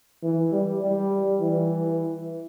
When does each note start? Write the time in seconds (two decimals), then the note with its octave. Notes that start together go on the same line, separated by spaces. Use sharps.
0.22 E3
0.52 G3
0.81 G3
1.40 E3